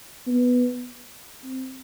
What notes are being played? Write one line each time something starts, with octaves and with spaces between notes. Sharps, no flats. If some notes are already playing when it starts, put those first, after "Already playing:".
B3
C4